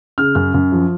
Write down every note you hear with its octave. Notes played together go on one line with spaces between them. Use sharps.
C#3 F6
F#2 F6
F#2
F3